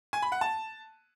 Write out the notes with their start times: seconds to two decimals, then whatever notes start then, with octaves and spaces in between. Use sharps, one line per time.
0.13 G#5
0.22 B5
0.32 F#5
0.41 A5